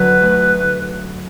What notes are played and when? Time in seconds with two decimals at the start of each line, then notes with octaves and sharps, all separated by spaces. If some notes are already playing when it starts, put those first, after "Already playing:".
Already playing: D3 F#3 B4
0.21 D2